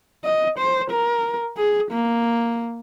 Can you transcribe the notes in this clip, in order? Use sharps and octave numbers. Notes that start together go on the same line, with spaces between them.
D#5
C5
A#4
G#4
A#3